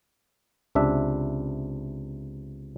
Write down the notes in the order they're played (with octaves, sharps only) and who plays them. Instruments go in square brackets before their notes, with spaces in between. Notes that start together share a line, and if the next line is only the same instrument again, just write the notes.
[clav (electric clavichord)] C#2 C3 D4 E5